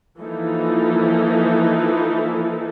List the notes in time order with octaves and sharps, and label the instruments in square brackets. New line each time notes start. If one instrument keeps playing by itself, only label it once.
[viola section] E3 F3 A#3 D#4 E4 A4